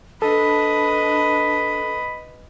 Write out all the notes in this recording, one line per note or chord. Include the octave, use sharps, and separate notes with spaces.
D4 A4 B4 D#5 B5